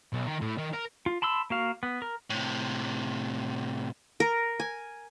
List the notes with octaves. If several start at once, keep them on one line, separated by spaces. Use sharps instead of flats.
B1
D#3
A2
D#3
A#4
F4
A5 B5 C6 E6
A#3 F#4 F5
B3
A#4
A2 C3
A#4
G#5